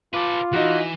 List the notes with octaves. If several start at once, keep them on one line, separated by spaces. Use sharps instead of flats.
F4 A4 B4 D6
E3 D#4 F#4